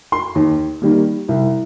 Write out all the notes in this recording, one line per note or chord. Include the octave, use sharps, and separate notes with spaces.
C6
D#2
D#3 G3 A#3
C2